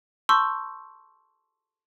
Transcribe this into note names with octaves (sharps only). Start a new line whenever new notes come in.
A5 C6 C#6 E6 G6